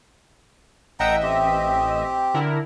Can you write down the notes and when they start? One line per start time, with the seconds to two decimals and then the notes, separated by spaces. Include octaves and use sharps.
1.00 A1 D#5 E5 F#5 G5 A#5
1.23 C4 G4
2.34 D3 E4 A#4